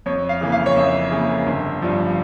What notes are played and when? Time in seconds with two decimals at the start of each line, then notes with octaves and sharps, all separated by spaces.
0.06 F2 C#5
0.29 F5
0.41 C#3 E3 A#3
0.52 F5
0.66 C#5
0.76 F2 E5
1.12 C#3 E3 A#3
1.47 G1
1.82 G2 F3